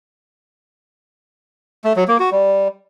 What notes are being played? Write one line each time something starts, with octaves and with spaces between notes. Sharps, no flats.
A3
F#3
A#3
F#4
G3